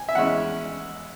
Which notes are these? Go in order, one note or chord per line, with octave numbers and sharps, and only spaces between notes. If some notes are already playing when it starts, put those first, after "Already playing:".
Already playing: G#5
E5
E2 C#3 G#3 C#4 E4 F#5